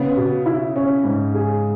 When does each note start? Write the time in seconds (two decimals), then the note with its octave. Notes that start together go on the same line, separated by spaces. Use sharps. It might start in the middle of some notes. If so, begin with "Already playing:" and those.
Already playing: C#3 B3
0.17 B2
0.46 E4
0.76 C#4
1.04 G#2
1.34 G#4